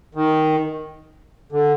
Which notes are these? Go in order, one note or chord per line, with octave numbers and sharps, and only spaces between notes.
D#3
D3